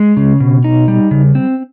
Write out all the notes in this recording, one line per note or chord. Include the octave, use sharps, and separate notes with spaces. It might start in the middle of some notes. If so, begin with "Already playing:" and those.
Already playing: G#3
C#3
B2
D#4
G3
C#3
C4